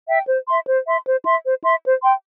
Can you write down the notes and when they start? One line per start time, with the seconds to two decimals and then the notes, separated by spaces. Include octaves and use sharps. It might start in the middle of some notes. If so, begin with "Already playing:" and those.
0.09 E5 G5
0.28 C5
0.48 E5 C6
0.67 C5
0.87 E5 C6
1.06 C5
1.25 E5 C6
1.45 C5
1.64 E5 C6
1.83 C5
2.03 G5 C6